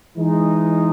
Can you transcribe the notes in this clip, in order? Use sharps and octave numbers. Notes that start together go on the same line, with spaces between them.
E3 G#3 D#4